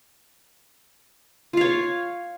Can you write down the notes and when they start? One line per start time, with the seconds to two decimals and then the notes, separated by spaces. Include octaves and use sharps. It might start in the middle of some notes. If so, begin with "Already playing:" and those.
1.53 F4
1.57 F5
1.61 C#5